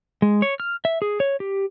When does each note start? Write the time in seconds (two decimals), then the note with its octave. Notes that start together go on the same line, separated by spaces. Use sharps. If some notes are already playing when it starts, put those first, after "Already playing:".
0.22 G#3
0.42 C#5
0.60 F6
0.85 E5
1.02 G#4
1.20 C#5
1.40 G4